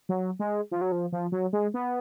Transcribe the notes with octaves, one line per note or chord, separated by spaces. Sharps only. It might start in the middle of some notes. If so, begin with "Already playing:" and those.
F#3
G#3
F3
F#3
F3
F3
F#3
G#3
B3